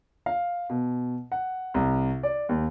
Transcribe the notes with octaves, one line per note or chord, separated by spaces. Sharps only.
F5
B2
F#5
C2
D5
D#2